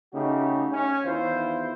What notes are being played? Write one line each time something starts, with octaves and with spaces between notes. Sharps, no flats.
C#3 A3 D#4 F#4 G4
C#4
E2 D#3 E4 F4 C5